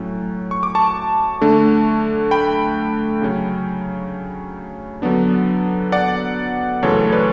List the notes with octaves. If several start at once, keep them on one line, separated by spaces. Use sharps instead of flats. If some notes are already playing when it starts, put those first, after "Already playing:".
Already playing: A2 F#3 C#4
C#6
D6
A5 C#6
D3 A3 D4
G5 B5
C#3 F#3 C#4
D3 F#3 B3 D4
D5 F#5
F#2 C#3 E3 A3 A4 C#5
B4 D5